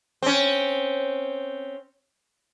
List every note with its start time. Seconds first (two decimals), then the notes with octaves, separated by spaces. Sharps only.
0.23 C4 C#4